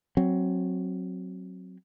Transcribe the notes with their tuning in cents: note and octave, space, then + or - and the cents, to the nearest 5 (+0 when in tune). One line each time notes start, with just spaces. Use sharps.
F#3 +0 C4 +15